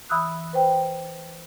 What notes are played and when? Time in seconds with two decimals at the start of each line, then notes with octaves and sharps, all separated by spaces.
0.10 E3 B5 D#6 E6 F#6
0.53 B4 C5 G5